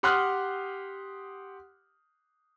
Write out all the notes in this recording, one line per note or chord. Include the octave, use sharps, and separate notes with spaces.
G4 F#5 C6 D#6 F6 F#6